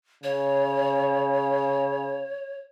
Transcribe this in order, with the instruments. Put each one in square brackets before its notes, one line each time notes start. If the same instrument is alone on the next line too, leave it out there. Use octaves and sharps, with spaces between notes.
[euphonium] C#3 [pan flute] C#5